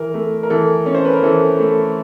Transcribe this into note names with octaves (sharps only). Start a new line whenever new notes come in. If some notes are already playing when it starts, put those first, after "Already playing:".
Already playing: E3 A#4
A3
A#4
E3 A4
C#4
C5
B4
A#4
E3 A4
A3